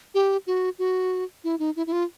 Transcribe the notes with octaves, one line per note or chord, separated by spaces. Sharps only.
G4
F#4
F#4
E4
D#4
E4
E4
F4